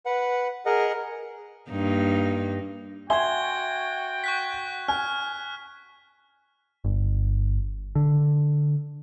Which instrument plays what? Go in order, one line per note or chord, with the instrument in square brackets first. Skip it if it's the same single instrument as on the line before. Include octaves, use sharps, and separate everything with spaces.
[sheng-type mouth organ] B4 F#5
G#4 A#4 D#5 F#5
[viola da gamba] G2 A#3 D#4
[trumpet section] F#4 G5 [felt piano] E5 G#5 C6 [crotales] G#6 G7
[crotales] C#6 F#6 B6
[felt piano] G#5 [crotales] F6
[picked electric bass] G1
D3